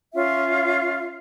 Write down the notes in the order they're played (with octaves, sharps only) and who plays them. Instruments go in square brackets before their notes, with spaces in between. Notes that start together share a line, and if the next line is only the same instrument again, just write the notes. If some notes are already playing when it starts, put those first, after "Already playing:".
[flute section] C#4 F4 E5